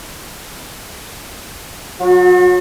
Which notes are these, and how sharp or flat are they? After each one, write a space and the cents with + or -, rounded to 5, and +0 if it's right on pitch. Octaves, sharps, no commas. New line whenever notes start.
F#3 -15 F#4 -45